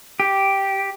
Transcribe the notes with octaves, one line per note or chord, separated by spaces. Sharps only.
G4